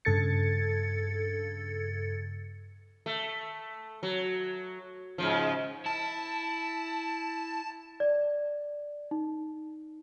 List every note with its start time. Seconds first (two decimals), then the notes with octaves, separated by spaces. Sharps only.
0.05 G2 C#3 A4 G#6 A6 C#7
3.06 A3
4.03 F#3
5.18 G#2 C#3 F3
5.86 E4 A5
8.00 D5
9.11 D#4